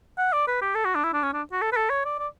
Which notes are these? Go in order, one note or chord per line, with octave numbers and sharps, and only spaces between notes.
F#5
D5
B4
G4
A4
F#4
D4
E4
D4
C#4
D4
F#4
A4
B4
A4
C#5
D5
D5